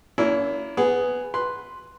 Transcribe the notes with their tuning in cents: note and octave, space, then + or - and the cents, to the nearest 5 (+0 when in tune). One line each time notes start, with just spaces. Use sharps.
A#3 +10 C#4 +45 E4 +10
B3 +10 G#4 +0
B4 +0 C6 +0